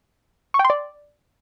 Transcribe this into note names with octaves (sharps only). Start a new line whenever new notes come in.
C#6
G5
C6
D5